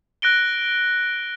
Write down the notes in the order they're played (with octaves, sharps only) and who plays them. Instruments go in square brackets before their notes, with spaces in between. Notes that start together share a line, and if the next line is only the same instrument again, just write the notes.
[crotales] F#6 A#6 D7 G7